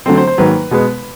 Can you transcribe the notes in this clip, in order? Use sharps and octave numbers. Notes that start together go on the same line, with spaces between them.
D3 F#3 A3 C4 C5
C5
C5
G#2 D#3 F#3 A#3 B4
B2 G#3 B3